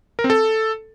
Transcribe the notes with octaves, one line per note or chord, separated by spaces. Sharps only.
A#4
C4
A4